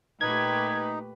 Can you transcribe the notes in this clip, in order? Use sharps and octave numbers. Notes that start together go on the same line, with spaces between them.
A#2 A3 D#4 G4 B4 G#6